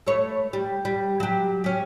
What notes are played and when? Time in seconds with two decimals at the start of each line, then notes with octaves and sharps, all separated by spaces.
0.07 A3 B4 C#5
0.53 G3
0.85 G3
1.20 F#3 G4
1.64 C#4 G4